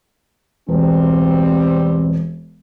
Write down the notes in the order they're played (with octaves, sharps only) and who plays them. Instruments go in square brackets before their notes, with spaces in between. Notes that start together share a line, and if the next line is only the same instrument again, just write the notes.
[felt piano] E1 [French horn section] G3 C4